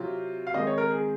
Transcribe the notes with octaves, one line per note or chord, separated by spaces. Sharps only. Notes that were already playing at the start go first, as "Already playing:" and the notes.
Already playing: C3 F#3 C4 F4
F5
D#3 G#3 C4 D#5
C#5
A#4
G#4